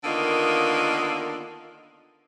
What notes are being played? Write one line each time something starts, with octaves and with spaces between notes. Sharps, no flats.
D3 D#3 A#3 B3 F4